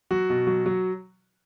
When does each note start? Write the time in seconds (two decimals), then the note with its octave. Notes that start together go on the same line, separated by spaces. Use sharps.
0.11 F#3 F#4
0.30 B2
0.47 F#3
0.66 F#3